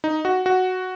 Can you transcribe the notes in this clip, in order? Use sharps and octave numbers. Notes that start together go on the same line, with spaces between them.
D#4
F#4
F#4